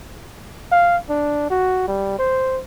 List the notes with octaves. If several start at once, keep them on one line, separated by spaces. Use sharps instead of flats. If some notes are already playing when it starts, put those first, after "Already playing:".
F5
D4
F#4
G3
C5